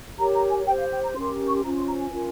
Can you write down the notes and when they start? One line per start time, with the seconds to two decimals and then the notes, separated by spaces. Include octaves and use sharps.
0.18 G4 A#4 C#5 A#5
0.35 A#5
0.51 G#5
0.67 G4 C5 G5
0.79 F5
0.91 G5
1.03 A#5
1.15 C#4 G4 A#4 C6
1.47 C#6
1.55 C6
1.64 C#4 F4 C5 A#5
1.76 C6
1.87 A#5
2.00 G#5
2.12 C#4 F4 A#4